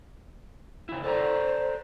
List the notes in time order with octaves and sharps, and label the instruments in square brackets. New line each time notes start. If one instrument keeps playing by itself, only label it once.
[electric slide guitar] C#3 E4
[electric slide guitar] A4 D5 A#5 [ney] C5